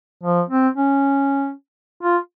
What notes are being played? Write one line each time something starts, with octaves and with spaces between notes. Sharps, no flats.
F3
C4
C#4
F4